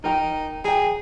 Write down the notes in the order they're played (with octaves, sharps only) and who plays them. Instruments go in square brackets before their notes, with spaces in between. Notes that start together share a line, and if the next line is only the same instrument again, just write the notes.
[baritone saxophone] D#4 [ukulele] A#4 G5 A#5
[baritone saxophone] G#4 [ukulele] G5 A#5